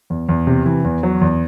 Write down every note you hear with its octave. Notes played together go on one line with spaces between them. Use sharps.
E2
E2
C3
E3
E2
F#3
E2